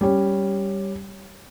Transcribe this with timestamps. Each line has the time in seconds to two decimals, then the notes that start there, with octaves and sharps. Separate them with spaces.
0.01 G3 C#4